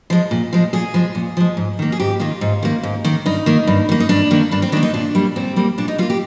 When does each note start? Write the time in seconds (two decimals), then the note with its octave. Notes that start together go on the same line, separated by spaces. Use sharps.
0.10 F3 G#3
0.31 A#2
0.53 F3 G#3
0.73 A#2 G#4
0.94 F3 G#3
1.15 A#2
1.37 F3 G#3
1.57 G#2
1.79 D#3 A#3
1.92 G#4
1.99 G#2 G4
2.20 D#3 A#3 F4
2.41 G#2
2.62 D#3 A#3
2.83 G#2
3.04 D#3 A#3
3.26 G2 D#4
3.46 D#3 A#3
3.67 G2
3.89 D#3 A#3
4.00 D#4
4.09 G2 D4
4.31 D#3 A#3
4.51 G2 D4
4.62 C4
4.72 D#3 D4
4.77 A#3
4.83 D#4
4.94 A#2 D4
5.15 G3 A#3
5.36 A#2 C4
5.56 G3 A#3
5.78 A#2 D4
5.88 D#4
5.98 G3 F4
6.03 A#3
6.10 G4